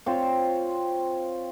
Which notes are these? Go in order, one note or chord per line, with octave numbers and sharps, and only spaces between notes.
C4 F4 C5 C#5